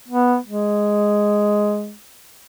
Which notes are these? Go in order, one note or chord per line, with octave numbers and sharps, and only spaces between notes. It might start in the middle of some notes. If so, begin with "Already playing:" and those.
B3
G#3